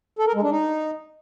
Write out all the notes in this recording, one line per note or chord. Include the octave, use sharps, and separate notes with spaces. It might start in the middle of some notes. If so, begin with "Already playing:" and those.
A4
A#4
G#3
D4
D#4